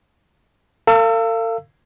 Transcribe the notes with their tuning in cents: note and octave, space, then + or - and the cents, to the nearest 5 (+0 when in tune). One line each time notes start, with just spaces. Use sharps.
A4 +45 F5 -25 E6 +10